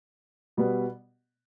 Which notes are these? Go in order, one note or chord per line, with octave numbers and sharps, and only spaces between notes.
B2 G3 B3